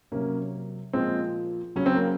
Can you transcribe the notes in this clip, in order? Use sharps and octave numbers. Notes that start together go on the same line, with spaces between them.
C3 F#3 A#3 C#4
A#2 F3 G#3 C4
C#3 F#3 C#4
C4
A#3